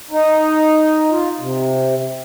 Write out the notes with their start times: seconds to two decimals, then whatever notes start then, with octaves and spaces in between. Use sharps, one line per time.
0.11 D#4
1.10 F4
1.40 C3